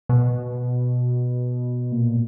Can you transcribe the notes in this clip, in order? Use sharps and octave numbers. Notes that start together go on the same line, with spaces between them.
B2
A#2